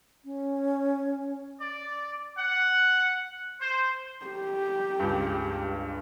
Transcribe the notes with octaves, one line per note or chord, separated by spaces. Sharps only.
C#4
D5
F#5
C5
G4
C#2 G2